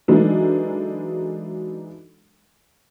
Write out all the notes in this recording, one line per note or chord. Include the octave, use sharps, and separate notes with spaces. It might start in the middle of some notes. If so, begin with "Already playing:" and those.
E3 F#3 G#3 D4 D#4 A4